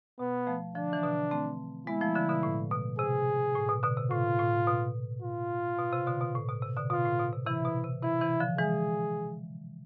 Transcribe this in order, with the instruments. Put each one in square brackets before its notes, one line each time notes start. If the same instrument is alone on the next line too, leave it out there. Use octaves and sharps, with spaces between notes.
[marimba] B2 [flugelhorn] B3
[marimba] F3 A3
[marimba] D3 F3 [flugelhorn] D4
[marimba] E3
B2 D3
A3 C4
[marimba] G#3 B3 [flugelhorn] E4
[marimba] F3 A3
D3 F3
B2 D3
A2
B2
[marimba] C3 [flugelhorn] G#4
[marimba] A2
B2
B2 D3
C3
[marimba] A2 [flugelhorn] F4
[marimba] A2
B2
[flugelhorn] F4
[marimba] B2
C3
B2 D3
B2
A2
B2
C3
B2 D3
[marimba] B2 [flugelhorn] F4
[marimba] A2
B2
C3
[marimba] C3 E3 [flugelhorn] E4
[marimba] B2
C3
[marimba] C3 E3 [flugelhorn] E4
[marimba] C3 E3
D3 F3
[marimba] E3 G#3 [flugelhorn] G#4